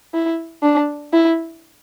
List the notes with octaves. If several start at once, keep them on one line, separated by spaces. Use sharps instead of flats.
E4
D4
E4